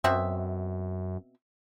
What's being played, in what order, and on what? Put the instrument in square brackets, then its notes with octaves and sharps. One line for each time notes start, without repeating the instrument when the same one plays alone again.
[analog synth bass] F#2 [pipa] B2 C4 E5